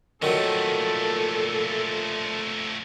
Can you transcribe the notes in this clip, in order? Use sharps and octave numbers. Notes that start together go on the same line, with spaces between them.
A#2 D#3 F3 F#3 A3 A4